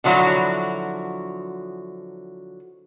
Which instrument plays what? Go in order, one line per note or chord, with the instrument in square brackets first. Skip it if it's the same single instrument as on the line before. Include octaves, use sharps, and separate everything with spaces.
[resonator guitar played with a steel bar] D3 F3 F#3 E4 F#4